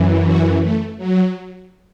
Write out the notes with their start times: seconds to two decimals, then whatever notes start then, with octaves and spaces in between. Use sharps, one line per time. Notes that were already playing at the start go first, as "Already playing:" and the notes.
Already playing: F#2 E3
0.25 F#4
0.61 A3
0.97 F#3